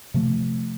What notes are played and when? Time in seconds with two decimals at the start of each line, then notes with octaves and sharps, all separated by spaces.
0.14 C3 F3 A3